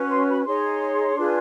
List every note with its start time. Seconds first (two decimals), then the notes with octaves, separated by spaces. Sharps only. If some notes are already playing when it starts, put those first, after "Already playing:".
Already playing: C#4 F#4 B4
0.11 C6
0.29 B5
0.46 D#4 G#4 C#5 C6
1.15 D4 F4 G#4 B4